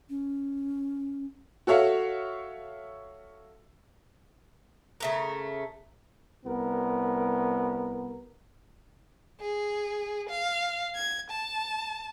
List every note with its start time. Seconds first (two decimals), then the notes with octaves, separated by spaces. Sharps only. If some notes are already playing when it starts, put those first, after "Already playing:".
0.09 C#4
1.67 F#4 A4 C#5 E5 F5
5.00 C#3 A3 A#4
6.46 C2 B3 A#4
9.41 G#4
10.29 F5
10.95 G#6
11.31 A5